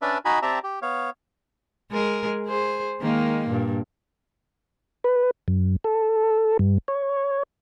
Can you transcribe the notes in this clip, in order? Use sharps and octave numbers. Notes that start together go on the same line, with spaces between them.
C#4 D4 B4 D5 E5 A5
D#4 F#4 D#5 G#5 B5
C4 G4 D5 E5 A5 A#5
G4
B3 C#5 F5
G#3 G#4 A#4
G#4 C5
D#3 G#3 A#3
G2 A#2
B4
F#2
A4
G2
C#5